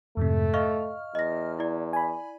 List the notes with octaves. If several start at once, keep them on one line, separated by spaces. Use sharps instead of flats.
F2 G#2 C3 A3
D#5 F5 C#6 F6
E2 D#5 A#6
E4 D5
G#5 B5